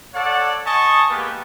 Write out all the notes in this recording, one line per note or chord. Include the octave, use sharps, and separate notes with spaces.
A4 C#5 D5 F#5
D#5 G#5 A5 C#6
G#3 A#3 B3 G4 B4